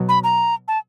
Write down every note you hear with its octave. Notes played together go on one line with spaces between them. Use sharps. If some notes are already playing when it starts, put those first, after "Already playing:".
Already playing: B2 F#3
B5
A#5
A5